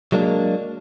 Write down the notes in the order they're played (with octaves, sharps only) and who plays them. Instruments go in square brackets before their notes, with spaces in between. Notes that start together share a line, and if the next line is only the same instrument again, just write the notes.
[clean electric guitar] F#3 G#3 A#3 D4